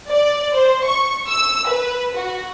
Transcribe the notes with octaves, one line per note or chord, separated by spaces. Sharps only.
D5
C5
C#6
E6
B4
F#4